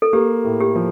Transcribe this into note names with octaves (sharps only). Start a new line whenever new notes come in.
A4
A#3 G4
A2
G4
F3